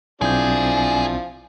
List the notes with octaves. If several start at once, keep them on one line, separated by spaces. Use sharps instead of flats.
B1 F3 C4 D4 E4 G#4 G6